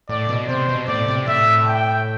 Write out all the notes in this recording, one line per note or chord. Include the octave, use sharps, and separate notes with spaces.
A2 D5
B2
C3 C5
B2
A2 D5
C3
A2 E5
G5